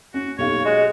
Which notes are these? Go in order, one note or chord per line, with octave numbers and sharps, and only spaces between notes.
C#4 F#4
B1 G4 C#5 F5
G#3 F#4